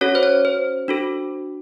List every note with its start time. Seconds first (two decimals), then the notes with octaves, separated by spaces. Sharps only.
0.01 C#4 F#4 A4 C#5
0.15 C5
0.23 C#5
0.45 C5
0.88 D4 F#4 A4